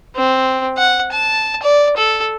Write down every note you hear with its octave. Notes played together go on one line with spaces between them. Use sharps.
C4
F#5
A5
D5
A4